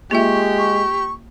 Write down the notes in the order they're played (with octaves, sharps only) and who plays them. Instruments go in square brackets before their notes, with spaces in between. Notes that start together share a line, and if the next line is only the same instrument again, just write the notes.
[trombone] G#3 [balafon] A#3 F4 E5 [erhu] G4 [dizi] C#6
[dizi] C#6